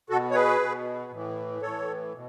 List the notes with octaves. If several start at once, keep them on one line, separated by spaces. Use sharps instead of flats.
B2 F#4 A4
C#5
G#4 B4
B2
A2 E3
A2 E3 A4 C#5
B2